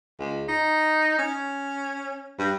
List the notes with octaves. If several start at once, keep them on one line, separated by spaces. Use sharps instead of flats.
C#2
D#4
C#4
G2